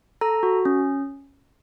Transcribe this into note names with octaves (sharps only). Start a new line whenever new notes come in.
A4 A#5
F#4
C#4